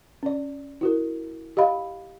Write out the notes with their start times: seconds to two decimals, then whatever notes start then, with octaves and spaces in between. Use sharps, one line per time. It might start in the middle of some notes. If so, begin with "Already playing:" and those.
0.23 C#4 D5
0.81 E4 F#4 A#4
1.57 G4 D#5 F5 B5